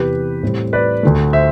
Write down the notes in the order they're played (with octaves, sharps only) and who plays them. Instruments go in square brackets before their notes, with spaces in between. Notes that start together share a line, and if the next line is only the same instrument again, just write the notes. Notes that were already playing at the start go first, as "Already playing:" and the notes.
Already playing: [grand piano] E2 C3 E3 G4 B4
A2 G3 C4
B4 D5
D2 D3 A3
C5 E5